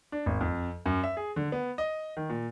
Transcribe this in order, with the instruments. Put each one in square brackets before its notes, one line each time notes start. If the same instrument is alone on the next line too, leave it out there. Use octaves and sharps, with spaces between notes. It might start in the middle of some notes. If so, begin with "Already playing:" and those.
[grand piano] D4
G#1
F2
F#2
E5
G#4
D3
B3
D#5
D#3
A#2